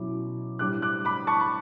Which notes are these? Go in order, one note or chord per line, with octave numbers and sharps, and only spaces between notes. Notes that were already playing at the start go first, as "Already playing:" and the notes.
Already playing: B2 F#3 C#4 E4 D6
A2 G3 D4 D6 F#6
D6 F#6
B5 D6
A5 C#6
B5